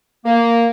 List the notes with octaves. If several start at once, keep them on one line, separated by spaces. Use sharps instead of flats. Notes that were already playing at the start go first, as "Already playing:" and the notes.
A#3